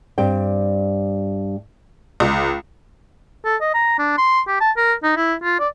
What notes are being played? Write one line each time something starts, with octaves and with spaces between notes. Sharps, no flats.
G2 G3 C4 G5
C#2
A4
D#5
A#5
D4
C6
G4
A5
A#4
D#4
E4
F4
D5